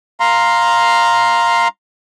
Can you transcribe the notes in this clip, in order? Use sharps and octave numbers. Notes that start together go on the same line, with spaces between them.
F5 A#5 C6